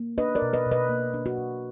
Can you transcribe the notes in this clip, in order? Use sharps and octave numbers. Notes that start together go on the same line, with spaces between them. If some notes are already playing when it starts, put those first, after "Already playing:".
Already playing: A#3
D4 B4 D#5
A#4 D5
B2
B4 D#5
B2
B4 D#5
A#3
D4
F#4
B2